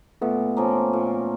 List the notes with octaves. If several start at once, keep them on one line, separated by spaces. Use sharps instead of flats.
A#2 A3 B3
F3 A#3 C#4
A#2